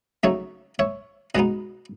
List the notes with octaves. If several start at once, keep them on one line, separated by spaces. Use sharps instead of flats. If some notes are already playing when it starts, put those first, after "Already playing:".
C#3 F#3 A3 D#4 C#5 E5
C#5 E5
B2 G#3 B3 D#4 B4 D#5